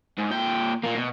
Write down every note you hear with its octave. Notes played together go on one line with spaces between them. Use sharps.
G#2
A#2 G5
A#2 A#3
B2